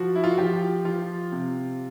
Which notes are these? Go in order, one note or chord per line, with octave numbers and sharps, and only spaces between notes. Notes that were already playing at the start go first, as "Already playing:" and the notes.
Already playing: F3 F#4
E4
F4
F#4
F3 G4
F3 F4
C3